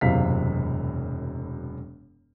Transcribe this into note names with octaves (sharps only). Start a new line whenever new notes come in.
E1 F#2 A2 C3 F5 B6